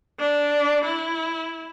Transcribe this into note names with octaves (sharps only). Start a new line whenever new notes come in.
D4
E4